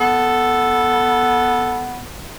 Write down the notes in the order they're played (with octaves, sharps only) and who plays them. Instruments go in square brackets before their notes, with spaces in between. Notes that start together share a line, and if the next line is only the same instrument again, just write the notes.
[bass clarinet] B3 [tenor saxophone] A4